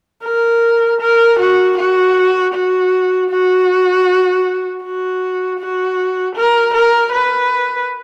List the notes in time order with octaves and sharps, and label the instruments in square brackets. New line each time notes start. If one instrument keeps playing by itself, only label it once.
[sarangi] A#4
A#4
F#4
F#4
F#4
F#4
F#4
F#4
A#4
A#4
B4